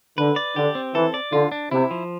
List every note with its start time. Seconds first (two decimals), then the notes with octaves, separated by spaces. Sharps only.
0.18 D3 B4
0.36 D5
0.56 D3 G4
0.75 C4
0.94 E3 A4
1.14 D5
1.32 D3 F4
1.52 D4
1.71 C3 E4
1.91 F3